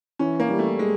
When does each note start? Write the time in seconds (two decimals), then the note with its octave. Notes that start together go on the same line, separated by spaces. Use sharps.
0.19 E3 C#4
0.40 A#3
0.50 G3
0.59 A3
0.79 G#3